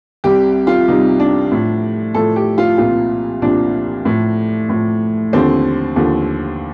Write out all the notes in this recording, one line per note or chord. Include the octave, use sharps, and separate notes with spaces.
C2 C3 G3 G4
F4
C2 C3 G3 D#4
D4
A2 F3
A2 F3 A4
G4
F4
C2 A#2 F3 F4
C2 A#2 F3 D4
A2 F3
A2 F3
D#2 D3 F3 C4
D#2 D3 F3